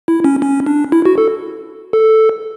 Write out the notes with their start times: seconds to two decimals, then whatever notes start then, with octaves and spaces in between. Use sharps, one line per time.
0.08 E4
0.24 C#4
0.42 C#4
0.66 D4
0.92 E4
1.05 F#4
1.18 A4
1.93 A4